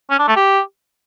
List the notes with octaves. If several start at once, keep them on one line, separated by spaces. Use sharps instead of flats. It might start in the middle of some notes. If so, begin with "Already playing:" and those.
C#4
D4
A3
G4